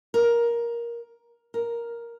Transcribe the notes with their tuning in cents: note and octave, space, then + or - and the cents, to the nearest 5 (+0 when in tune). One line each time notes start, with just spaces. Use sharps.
A#4 +10
A#4 +5